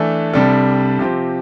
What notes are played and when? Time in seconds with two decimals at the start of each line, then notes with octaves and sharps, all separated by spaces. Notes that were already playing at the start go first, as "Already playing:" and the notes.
Already playing: E3 A3 D4 A4
0.33 C2 C3 G3 D4 A4
0.99 C3 F3 C4 G4